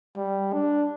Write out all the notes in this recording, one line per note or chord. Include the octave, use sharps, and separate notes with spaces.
G3
D4